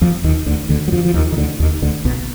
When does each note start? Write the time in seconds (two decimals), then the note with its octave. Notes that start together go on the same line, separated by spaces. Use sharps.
0.01 F2 F3
0.24 D#2 D#3
0.46 D2 D3
0.69 D2 D3
0.88 F#3
0.92 F2 F3
1.05 F3
1.14 D#2 D#3
1.32 D#3
1.37 D2 D3
1.60 D#2 D#3
1.82 D2 D3
2.05 B1 B2